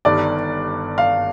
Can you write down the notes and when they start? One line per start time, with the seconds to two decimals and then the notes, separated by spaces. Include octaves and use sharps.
0.05 G1 G2 D#3 D5
0.98 F5